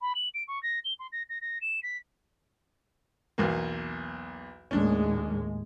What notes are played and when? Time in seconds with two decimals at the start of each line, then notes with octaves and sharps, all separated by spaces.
0.01 B5
0.15 F#7
0.34 D7
0.48 C#6
0.63 A#6
0.84 G7
0.99 C6
1.12 A#6
1.29 A#6
1.41 A#6
1.61 E7
1.83 B6
3.38 B1 E2 A#3
4.71 D#2 A2 G#3 C#4 D4